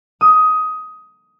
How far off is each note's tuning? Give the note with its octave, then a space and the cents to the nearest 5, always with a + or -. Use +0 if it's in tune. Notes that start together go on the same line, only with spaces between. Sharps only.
D#6 +15